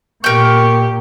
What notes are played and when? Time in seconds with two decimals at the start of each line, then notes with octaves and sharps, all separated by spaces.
0.24 A#2 A#3 G4 A#4 C#6 G6